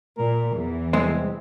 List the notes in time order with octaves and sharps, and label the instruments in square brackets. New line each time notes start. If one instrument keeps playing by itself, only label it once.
[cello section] A#2 [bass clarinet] A#4
[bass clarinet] E2 [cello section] E3
[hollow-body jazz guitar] C2 G#3 C4